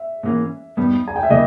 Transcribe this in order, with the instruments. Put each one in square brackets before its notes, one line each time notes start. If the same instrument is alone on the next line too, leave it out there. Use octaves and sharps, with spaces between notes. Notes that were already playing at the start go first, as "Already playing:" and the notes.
Already playing: [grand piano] E5
[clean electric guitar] G#2 E3 A#3 C#4
G2 G3 B3 D#4
[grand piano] G#5
G5
E5
[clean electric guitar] C#3 G3 A#3 E4 [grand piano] D#5